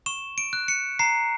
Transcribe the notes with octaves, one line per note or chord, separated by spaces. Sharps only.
C#6 E7
D7
F#6
C#7
A#5 C7